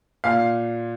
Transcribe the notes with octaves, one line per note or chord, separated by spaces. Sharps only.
A#2 F5